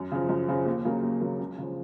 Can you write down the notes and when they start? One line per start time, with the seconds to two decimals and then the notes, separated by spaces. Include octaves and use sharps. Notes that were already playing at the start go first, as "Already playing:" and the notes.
Already playing: F#2
0.12 C#3 F3
0.29 F#2
0.49 C#3 F3
0.66 D#2
0.85 C#3 F#3 A#3
1.03 D#2
1.21 C#3 F#3 A#3
1.39 C#2
1.58 C#3 F3